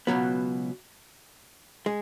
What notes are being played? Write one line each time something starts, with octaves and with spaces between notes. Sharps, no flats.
C#2 B2 F#3 B3
G#3